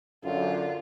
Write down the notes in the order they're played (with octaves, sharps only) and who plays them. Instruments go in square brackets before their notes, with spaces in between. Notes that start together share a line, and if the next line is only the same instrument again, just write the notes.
[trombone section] F#2 [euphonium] D3 [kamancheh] F4